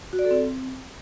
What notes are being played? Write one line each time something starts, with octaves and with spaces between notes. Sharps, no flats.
F#4
D5
A4
C4